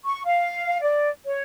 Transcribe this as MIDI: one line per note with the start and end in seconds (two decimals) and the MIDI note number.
0.04 0.22 85
0.25 0.78 77
0.82 1.09 74
1.25 1.42 73